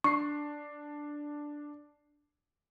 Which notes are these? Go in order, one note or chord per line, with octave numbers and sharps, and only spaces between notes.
D4 C#6 C7